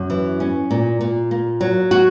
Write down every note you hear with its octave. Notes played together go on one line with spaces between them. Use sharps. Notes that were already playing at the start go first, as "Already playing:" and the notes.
Already playing: F#2
E3
C#4
A#2
A#2
A#3
F#3
F#4